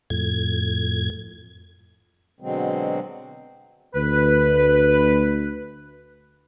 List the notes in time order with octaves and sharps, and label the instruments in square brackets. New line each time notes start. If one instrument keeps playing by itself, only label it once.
[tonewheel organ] F2 A2 G#6
[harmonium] B2 D3 F#3 G#3 C4
[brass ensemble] D2 [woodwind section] B4